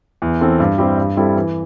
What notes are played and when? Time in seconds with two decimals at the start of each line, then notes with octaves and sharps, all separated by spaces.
0.22 E2
0.41 E3 C4 A4
0.60 G2
0.78 G3 C4 E4 G4
0.98 G2
1.17 G3 C4 E4 A4
1.36 E3